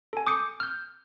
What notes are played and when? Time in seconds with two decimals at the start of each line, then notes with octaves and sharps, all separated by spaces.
0.13 A4 G#5
0.27 D6 D#6 G6 C#7
0.60 F6 G6